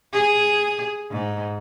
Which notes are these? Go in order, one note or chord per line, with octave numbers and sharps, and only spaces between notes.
G#4
G#2